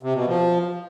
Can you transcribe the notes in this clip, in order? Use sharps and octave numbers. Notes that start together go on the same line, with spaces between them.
C3
B2
F3